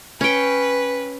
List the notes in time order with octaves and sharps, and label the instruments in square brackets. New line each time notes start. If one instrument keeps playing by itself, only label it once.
[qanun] C#4 G5 [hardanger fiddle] B4